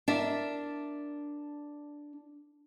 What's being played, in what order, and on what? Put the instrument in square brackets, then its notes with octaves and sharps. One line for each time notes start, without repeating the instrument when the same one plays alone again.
[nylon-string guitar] D4 A#4 E5